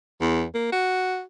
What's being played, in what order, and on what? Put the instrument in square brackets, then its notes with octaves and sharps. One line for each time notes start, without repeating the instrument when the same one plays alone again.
[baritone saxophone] E2
A#3
F#4